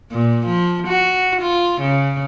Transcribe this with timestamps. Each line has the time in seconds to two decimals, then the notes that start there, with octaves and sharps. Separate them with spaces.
0.12 A#2
0.46 F3
0.87 F#4
1.41 F4
1.81 C#3